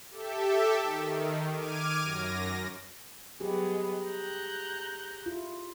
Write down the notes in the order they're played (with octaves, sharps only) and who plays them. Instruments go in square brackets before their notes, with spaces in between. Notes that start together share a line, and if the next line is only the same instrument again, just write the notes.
[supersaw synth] G4 A4 E5
D#3
D6 F6 G#6 D#7
F#2 A#6
[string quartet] F#3 G#3 B3 [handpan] G4 G#4
[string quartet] A#5 F#6 G6
[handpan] E4 F4